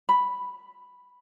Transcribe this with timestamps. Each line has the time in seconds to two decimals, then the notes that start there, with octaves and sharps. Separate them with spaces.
0.09 B5